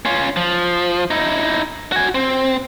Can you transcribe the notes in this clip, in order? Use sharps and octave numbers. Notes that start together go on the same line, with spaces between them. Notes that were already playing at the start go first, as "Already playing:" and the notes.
C#4 F4
F3
D#4 E4
F#4 G#5
C4